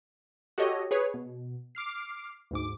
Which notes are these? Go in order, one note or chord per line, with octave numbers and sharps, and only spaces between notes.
F#4 G4 A4 C#5 D#5
G#4 B4 C#5
B2
D6 F6 C7
D2 G#2 D6